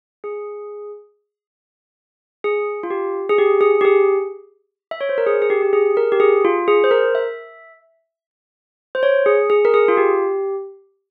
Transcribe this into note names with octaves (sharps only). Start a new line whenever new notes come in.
G#4
G#4
F4
G4
G#4
G4
G#4
G4
G#4
E5
C#5
C5
A#4
G#4
G#4
G4
G4
G#4
A#4
G4
G#4
F4
G#4
C5
A#4
E5
C5
C#5
G#4
G#4
A#4
G#4
F4
G4